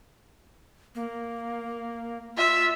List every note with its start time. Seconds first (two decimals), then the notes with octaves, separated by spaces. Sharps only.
0.95 A#3
2.37 F4 E5